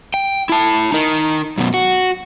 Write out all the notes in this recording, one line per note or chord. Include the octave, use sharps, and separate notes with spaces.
G5
E4 A5
D#4 A#4
F#2 B2
F#4